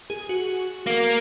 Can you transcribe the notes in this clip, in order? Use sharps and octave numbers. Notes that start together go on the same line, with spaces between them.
G#4
F#4
A#3